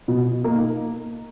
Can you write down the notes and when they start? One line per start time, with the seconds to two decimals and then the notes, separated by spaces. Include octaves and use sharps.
0.08 B2
0.44 A#3 D#4